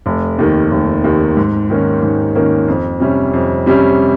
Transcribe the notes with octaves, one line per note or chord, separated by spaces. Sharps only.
F1
D#2 D#3
F1
D#2 D#3
G#2
D#3 A#3 C#4
G#2
D#3 A#3 C#4
F2
C3 G3 C#4
F2
C3 G3 C#4